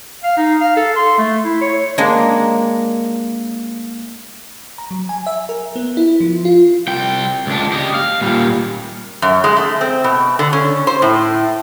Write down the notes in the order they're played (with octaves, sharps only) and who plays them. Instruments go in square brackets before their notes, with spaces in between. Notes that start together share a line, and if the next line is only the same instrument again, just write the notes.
[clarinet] F5
D#4
F5
A4
C6
A3
E4
C#5
[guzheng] G#3 A#3 D4
[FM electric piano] A#5
F#3
G#5
E5
A#4
B3
E4
F3
F4
[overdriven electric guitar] C2 G5
C#2 D4
G4 D#5
F5
A#2 G3
[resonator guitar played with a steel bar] F#2
G#3
A3
C4
B2
D3
C#4
C5
A2